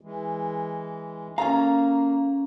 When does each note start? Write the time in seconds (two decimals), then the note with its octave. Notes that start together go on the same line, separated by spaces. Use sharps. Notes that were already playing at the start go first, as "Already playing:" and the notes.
0.01 E3 G#3
1.38 A#3 C#4 A4 F5 A#5